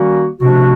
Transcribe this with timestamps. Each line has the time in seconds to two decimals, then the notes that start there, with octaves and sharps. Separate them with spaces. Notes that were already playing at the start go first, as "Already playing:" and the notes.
Already playing: D#3 G3 A#3 C#4 F#4
0.41 C3 F3 A3 D4 F#4